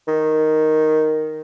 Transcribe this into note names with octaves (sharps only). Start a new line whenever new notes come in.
D#3